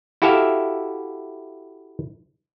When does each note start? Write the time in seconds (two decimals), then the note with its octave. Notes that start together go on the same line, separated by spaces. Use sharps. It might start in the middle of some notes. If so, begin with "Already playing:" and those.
0.22 E4 F#4 G4 A4 E5 F5